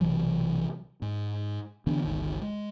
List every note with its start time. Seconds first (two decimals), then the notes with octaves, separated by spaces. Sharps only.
0.01 B1 C3 E3 F#3
1.02 G#2
1.87 D3 E3 B3 D4
2.04 G1 C#2 D#3
2.42 G#3